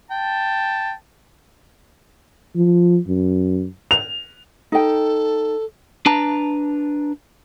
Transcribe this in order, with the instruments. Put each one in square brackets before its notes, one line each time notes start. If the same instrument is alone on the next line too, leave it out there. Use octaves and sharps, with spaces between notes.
[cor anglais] G5 [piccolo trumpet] A5
[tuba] F3
F#2
[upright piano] F7
[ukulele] D#4 G5 [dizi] A4
[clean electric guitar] D4 B4 A5 A#5